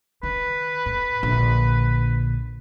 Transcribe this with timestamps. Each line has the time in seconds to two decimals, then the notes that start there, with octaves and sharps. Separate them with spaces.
0.23 D#3 B4
0.86 A2
1.23 A#1 D3